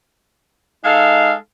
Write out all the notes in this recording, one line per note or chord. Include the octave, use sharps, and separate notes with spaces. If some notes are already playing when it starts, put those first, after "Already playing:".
G#3 D#4 A4 F5